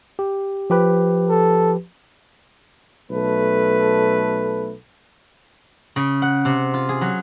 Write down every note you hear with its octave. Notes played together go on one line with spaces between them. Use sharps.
G4
F3 G4 B4
A4
B1 A3 A4 B4
C#3
F#5
C3
F4
G#4
F#3